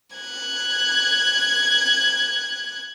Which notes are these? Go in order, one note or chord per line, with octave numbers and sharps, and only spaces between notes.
F#6 G#6